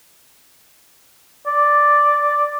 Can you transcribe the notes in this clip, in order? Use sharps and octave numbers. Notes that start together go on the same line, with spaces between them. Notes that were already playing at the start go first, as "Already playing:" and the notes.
D5